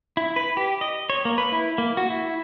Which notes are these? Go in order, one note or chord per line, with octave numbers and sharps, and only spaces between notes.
E4
B4
G4
D#5
C#5
A#3
B4
E4
A#3
F#4
E4